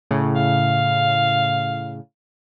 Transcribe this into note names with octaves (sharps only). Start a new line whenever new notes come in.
A2 C#3
F5